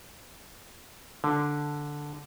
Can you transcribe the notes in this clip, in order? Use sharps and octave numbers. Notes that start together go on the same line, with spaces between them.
D3